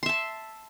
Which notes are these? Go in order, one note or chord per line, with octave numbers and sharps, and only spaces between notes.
E5 A5 C6